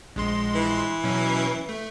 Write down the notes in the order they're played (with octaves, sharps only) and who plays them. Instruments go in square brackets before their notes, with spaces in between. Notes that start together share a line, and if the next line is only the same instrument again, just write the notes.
[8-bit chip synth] A#1 G#3 C6
[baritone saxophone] E3
[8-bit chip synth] B2 F#3 C#4
A3